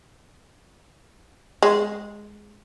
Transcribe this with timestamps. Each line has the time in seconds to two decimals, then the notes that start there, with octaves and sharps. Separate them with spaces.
1.63 G#3